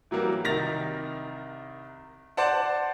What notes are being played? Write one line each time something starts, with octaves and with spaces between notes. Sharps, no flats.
E3 F#3 G3 A#3
C2 D#3 A6 A#6 F7
C5 D5 F#5 A5